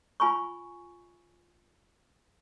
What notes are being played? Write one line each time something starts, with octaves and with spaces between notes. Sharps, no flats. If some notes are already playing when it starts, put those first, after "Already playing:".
F4 G#5 B5 C#6